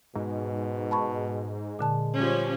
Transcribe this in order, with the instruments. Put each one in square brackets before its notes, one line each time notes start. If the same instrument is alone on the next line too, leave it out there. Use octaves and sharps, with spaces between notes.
[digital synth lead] G#2 [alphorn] B2
[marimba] A5 B5 C#6
[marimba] A#2 D3 A5 [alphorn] G#3
[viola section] F3 G3 C#4